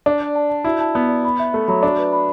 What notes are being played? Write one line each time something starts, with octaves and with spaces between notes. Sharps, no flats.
D4 D5
D5
A5
A5
E4 F#4
A5
B3 D5
D5
B5
E5
A3 E5
F#3 B5
D4 F#4
B4
B5